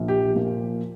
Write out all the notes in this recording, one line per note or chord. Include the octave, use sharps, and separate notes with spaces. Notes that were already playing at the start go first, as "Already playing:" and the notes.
Already playing: A#1
G4
A#2 F3 A#3 F4